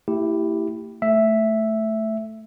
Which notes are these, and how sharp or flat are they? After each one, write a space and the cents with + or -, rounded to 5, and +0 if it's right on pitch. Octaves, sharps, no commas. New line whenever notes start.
A3 +45 E4 +0 G4 +0
A3 +0 E5 +0